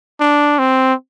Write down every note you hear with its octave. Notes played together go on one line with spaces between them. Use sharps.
D4
C4